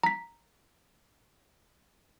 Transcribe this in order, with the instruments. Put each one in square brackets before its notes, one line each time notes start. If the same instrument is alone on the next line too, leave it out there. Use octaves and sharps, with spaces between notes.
[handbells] A#5 B6